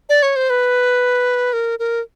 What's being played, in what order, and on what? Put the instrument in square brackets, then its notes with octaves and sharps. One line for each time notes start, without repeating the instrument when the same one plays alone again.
[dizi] D5
C#5
C5
B4
A#4
A#4